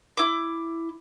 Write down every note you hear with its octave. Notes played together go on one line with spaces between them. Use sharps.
E4 D6